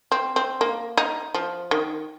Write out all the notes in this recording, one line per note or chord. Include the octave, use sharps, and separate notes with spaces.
C4
C4
A#3
D#4
F3
D#3